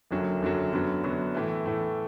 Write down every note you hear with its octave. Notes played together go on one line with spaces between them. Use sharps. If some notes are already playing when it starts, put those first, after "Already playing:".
F#1 F#2 D3 F#3
F#1 F#2 D3 F#3
F#2 D3 F#3 B3
F#2 D3 F#3 B3
A2 E3 A3
A2 E3 A3